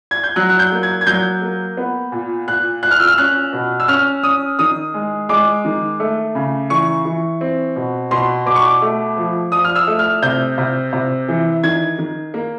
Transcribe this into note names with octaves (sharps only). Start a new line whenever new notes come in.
G#6
G6
F#3 F#6
F#6
G6
A#3
G#6
G#6
F#3 G6
A#3
B3
A#2
A#2 F#6
A#2 F#6
F6
E6
F6
C#4 F#6
B2
E6
C#4 F6
C#4 D#6
D#3 D#6
G#3
G#3 D6
D#3
A3
C#3
E3 C#6
E3
C4
B2
B2 C6
B2 D6
C#6
D6
A3
F3
F3 D#6
F6
E6
A3
F6
C3 G6
C3
C3
E3
D#3 G#6
D#3
A#3